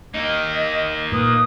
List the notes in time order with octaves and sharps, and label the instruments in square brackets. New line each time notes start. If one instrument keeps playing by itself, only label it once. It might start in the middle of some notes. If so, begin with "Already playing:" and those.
[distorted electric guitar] A#3 D#4 [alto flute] D#5
[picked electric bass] A#2 [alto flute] B4 [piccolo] D#6